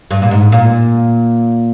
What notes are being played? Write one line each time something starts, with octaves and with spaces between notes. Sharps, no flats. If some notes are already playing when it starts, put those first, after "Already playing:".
G2
A#2
G#2
A#2